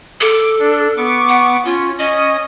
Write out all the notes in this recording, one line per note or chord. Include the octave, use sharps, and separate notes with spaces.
A4 D6
D4
B3 C#6 D6
F#5
C#4 F4
C#4 D#5 D#6